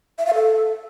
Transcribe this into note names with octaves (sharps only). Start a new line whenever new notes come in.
E5
F5
A4